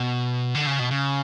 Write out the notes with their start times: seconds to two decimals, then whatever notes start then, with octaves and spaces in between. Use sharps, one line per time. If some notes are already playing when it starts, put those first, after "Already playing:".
Already playing: B2
0.55 D3
0.67 C#3
0.79 B2
0.91 C#3